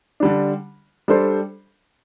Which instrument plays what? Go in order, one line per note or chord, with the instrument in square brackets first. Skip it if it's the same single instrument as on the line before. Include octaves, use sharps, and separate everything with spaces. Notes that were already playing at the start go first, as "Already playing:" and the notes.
[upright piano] D3 G3 D4
G3 D4 A4 C5